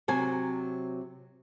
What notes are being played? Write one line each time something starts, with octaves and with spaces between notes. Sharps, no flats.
C3 F#3 G#5